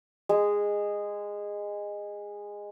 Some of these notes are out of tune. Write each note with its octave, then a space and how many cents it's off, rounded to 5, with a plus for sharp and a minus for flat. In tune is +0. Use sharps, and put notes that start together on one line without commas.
G#3 -15